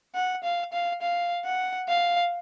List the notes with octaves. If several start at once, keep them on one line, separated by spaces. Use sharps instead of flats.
F#5
F5
F5
F5
F#5
F5